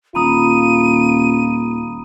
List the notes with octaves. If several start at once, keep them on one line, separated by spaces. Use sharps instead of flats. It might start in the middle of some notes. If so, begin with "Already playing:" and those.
D#1 F4 A#5 B5 D#6 D#7